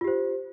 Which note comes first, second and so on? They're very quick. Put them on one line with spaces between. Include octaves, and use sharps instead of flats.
F4 G4 C5